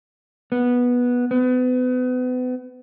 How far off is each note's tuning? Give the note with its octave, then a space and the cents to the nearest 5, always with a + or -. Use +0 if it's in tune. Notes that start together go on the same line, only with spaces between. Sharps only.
B3 -10
B3 +35